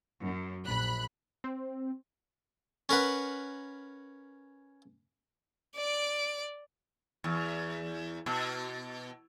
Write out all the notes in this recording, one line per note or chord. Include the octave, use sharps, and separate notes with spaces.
F#2
A#1 B5 F#6
C4
C#4 A#4 B4 F#5
D5 D7
E2
B2